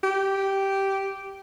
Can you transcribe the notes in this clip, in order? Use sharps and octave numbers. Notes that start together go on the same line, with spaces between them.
G4